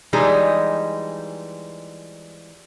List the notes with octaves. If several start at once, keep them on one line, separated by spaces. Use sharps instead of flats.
E3 F3 G3 G#3 D#4